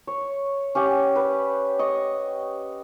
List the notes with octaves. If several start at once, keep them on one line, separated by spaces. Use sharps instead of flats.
C#5
C#4 G4 F#5
B4
D#5 C#6